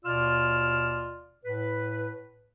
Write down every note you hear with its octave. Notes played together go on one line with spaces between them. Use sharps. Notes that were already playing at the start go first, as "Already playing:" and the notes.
D#2 B2 F4 D5 E6 F6
A2 B4